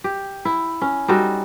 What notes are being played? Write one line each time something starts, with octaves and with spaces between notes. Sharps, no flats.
G4
E4
C#4
G3 D#4 F#4 A4